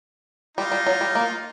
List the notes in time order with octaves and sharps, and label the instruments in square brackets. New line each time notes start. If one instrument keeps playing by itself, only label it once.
[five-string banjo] G3 [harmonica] D#4 F4
[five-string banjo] G3
F#3
G3
A#3